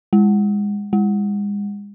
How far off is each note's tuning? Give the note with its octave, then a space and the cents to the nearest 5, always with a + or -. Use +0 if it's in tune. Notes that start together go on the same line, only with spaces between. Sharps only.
G#3 -25
G#3 -35